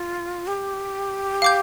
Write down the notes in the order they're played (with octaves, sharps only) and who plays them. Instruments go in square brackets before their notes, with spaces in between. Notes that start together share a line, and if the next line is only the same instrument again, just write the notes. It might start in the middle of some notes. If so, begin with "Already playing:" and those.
Already playing: [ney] F4
G4
[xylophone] F5 D6 G6